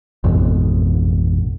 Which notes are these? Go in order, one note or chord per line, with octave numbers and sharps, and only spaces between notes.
A1 F2 G#2 B2